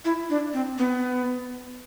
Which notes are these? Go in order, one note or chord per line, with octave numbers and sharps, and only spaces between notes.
E4
D4
C4
B3